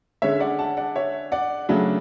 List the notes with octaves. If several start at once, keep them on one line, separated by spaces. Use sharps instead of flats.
D3 G#3 C#4 C#5 E5
D5 F#5
F#5 A5
D5 F#5
C#5 E5
D5 F#5
C#3 F#3 A3 D4